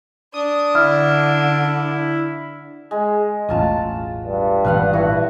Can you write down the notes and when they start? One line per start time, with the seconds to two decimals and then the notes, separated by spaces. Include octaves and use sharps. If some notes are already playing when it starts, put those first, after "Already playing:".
0.34 D4 D#6
0.75 D3 E4 F6
2.91 G#3
3.49 E1 A1 F#3 A3 F4 A5
4.26 G2
4.65 G#1 A#2 E3 B4 F5 F#5
4.93 E4 F#4 A4